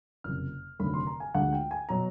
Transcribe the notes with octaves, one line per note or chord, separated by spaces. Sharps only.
F#1 F2 C3 F6
F1 D#2 D3 F#3 A3 B5
C6
A#5
G#5
D2 D3 F3 G#3 F#5
G5
G#5
B2 F#3 A#5